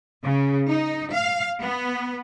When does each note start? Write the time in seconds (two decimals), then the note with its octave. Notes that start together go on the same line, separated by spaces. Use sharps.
0.23 C#3
0.69 D#4
1.12 F5
1.62 B3